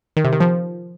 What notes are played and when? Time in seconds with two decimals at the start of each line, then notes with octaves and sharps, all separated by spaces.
0.17 D#3
0.24 C3
0.32 D#3
0.40 F3